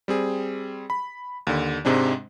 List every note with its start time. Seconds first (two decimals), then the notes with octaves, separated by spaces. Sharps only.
0.08 G3 C4 G#4
0.90 B5
1.47 D#2 D3
1.85 G#2 C3 G#3 C4 D4